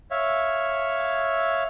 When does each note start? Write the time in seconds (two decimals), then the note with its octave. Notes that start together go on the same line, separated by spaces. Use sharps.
0.11 C#5 E5 F5